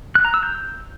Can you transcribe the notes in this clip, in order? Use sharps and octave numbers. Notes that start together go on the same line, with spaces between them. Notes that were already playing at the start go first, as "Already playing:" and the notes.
F#6
A#5
E6
G6